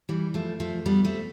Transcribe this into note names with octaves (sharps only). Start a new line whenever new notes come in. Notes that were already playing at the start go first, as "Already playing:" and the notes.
E3 G3
F3 A3
F3 A3
G3 B3
A3 C4